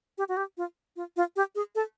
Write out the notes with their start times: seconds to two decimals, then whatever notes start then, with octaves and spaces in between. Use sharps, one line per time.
0.18 G4
0.29 F#4
0.37 G4
0.57 F4
0.96 F4
1.16 F4
1.36 G4
1.55 G#4
1.75 A4